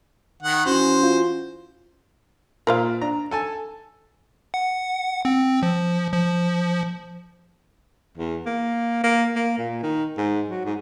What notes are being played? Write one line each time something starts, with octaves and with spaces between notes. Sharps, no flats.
D#3 F#5
E3 C#4 F#4 C5
F4
A#2 A#4 C5 F5
D4 A#5
A4 G#5 A5
F#5
C4
F3
F3
E2
A#3
A#3
A#3
A#2
D#3
G#2
F#3
G#2